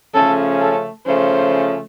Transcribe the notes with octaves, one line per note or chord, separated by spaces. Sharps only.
C#3 F3 A3 C#4 A4
A4
C#3 F3 A3 C#4 C5